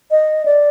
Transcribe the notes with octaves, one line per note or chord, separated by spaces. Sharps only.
D#5
D5